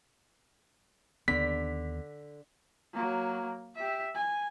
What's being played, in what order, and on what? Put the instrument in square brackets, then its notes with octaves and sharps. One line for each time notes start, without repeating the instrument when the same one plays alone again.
[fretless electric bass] D#2 B3 [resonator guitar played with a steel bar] D3 [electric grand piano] B6
[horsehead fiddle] F#3 A#3
G4 E5
G#5